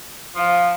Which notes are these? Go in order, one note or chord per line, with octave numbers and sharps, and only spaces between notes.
F3